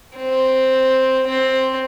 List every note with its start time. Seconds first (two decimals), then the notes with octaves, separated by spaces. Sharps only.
0.16 C4
1.26 C4